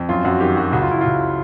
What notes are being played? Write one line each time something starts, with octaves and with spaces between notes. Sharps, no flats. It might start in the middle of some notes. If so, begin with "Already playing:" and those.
Already playing: F2
F#2 F4
F#2 F#4
D#3 G4
F#3 F#4
C#2 F#4
F4
C#2 E4
C#2 F4